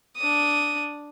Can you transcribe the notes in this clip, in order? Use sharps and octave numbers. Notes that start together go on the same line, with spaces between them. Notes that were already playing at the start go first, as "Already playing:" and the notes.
D4 D#6